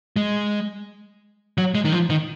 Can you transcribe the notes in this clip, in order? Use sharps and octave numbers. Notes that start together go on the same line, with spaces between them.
G#3
F#3
G#3
D#3
F3
D#3